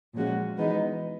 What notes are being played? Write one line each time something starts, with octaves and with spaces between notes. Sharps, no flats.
A#2 F3 G#3 C#4 F#4
E3 G#3 B3 D#4